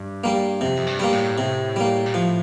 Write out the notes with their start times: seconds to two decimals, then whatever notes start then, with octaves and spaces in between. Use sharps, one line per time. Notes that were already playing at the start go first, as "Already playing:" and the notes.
Already playing: G2
0.24 G3 A#3
0.61 F2 C3
0.77 F2
0.87 G2
1.00 G3 A#3
1.13 A2
1.38 C3
1.76 G3 A#3
2.06 A#2
2.14 A2 F3